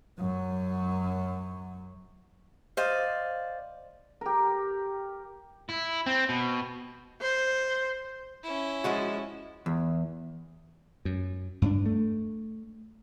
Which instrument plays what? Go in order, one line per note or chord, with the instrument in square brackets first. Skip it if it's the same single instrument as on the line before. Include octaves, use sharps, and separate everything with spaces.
[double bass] F#2 F#3
[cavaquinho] C5 D5 D#5 F5
[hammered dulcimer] G4 A#4
[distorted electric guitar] E4
C4
B2
[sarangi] C5
[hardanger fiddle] C#4 E4
[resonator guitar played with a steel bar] F3 G#3 F#4
[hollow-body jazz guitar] E2
[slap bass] F#2
G2 C4 D4
A3